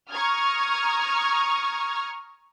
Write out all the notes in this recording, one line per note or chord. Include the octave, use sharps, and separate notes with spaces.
A#5 C#6 D#6 F6 G#6